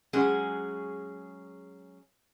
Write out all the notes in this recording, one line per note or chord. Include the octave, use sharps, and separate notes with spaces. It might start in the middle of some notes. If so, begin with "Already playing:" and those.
F#3 G#3 C#4 G#4